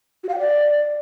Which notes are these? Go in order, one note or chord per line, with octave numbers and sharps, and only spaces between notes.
F#4
F5
G5
D5